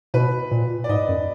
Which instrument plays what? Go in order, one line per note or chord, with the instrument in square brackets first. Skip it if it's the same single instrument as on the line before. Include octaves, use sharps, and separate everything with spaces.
[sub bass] B2 [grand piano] B4
[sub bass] A#2
[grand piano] D5
[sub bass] G#2 [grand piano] D#5
[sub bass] F#2